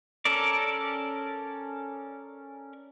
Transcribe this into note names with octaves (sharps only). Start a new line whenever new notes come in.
C#4 A4 A#4 D5